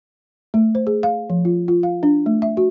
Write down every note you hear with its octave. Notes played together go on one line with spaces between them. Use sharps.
A3
C5
G#4
F5
F3
F4
F4
F5
D4
A3
E5
F#4